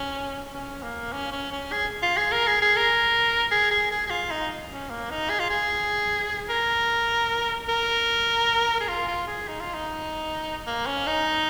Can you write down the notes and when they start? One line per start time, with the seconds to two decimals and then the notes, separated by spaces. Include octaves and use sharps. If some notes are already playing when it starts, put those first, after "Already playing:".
Already playing: C#4
0.53 C#4
0.83 A#3
1.13 C#4
1.33 C#4
1.52 C#4
1.72 G#4
2.02 F4
2.17 G#4
2.32 A#4
2.47 G#4
2.62 G#4
2.77 A#4
3.51 G#4
3.71 G#4
3.91 G#4
4.07 G#4
4.10 F4
4.31 D#4
4.70 C#4
4.90 A#3
5.11 D#4
5.30 G#4
5.40 F4
5.50 G#4
6.49 A#4
7.69 A#4
8.80 G#4
8.88 F4
9.08 F4
9.27 G#4
9.48 D#4
9.60 F4
9.74 D#4
10.67 A#3
10.87 C#4
11.07 D#4